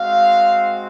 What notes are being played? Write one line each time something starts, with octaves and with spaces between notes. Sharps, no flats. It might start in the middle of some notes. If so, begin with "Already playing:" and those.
Already playing: G#3 C4 F#4 F5